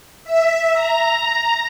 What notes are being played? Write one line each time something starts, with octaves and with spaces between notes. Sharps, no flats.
E5
A#5